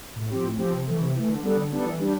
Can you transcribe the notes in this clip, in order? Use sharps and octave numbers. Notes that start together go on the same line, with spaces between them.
A2
F3 C4 G4
A2
F3 C4 G4
C3
E3 A3
C3
E3 A3
D3
G3 B3 D4 A4
D3
G3 B3 D4 A4
E3
G3 D4